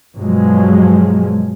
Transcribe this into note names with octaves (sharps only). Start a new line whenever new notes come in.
G2 B2 F3 F#3 G#3